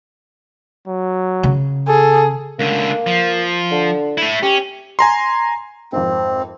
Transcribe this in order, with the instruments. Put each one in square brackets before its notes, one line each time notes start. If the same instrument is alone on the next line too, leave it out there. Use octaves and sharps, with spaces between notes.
[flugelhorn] F#3
[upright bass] C#3
[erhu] G#4 [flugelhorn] A4
[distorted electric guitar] C#2 D3 [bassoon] A#3
[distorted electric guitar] F3
[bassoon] D3
[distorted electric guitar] A3 E4
[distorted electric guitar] C#4 [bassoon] G4
[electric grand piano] G#5 A#5 C6
[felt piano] G#1 F2 [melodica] C4